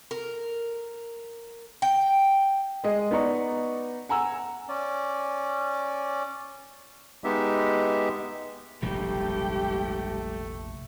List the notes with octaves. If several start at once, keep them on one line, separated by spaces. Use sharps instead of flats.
A#4
G5
G#3 D#5
B3 D#4 D5 A#5 C#6
F#5 G#5 A#5 E6
C#4 D5
G#3 B3 D#4 G4 E5
F1 A#1 G#2 B2 G3 A3 G4 G5